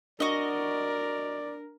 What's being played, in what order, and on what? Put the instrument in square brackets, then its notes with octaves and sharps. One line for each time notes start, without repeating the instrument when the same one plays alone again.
[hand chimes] D4 [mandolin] F#4 D#5 [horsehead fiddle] A#4 [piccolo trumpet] D5